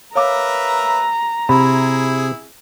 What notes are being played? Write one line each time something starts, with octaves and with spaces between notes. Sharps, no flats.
A#4 B4 C#5 E5 F5 A#5 D6
C3 E4 G#4 B5